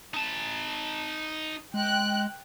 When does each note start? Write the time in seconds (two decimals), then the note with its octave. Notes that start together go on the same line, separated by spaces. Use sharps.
0.14 D#4 A5
1.74 G#3 G5 F#6